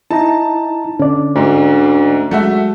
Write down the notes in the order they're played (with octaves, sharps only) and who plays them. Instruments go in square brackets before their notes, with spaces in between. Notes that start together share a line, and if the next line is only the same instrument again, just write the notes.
[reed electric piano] D#4 E4 A#5 [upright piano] A5
[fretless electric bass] D3 [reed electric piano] C#4 D5
[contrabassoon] D2 [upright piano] G#2
[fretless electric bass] F#3 G#3 [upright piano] A3 F#4 E5